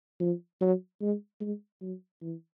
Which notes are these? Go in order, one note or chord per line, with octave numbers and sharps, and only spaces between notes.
F3
F#3
G#3
G#3
F#3
E3